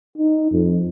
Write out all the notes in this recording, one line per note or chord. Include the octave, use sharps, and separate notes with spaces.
D#4
F2